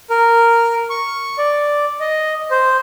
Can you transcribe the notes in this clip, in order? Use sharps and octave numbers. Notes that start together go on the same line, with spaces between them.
A#4
C#6
D5
D#5
C5